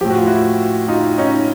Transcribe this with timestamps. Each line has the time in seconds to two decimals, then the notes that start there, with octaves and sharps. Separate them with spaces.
0.01 F3 G4
0.05 A2 F#4
0.18 F4
0.26 E4 F#4
0.88 D#4 F4
1.18 C#4 D#4